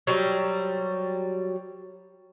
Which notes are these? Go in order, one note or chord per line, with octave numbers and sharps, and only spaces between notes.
F#3 G3 C5